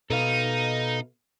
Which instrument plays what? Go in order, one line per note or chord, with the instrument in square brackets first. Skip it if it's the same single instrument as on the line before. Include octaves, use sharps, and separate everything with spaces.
[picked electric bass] B2 [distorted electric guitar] D#4 [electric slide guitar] A4 B4 F5